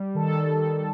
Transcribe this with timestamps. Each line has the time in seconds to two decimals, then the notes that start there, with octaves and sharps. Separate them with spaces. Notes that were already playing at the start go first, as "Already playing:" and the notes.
Already playing: G3
0.15 D#3 A4
0.51 D#3